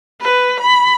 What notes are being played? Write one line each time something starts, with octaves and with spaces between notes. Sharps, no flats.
B4
B5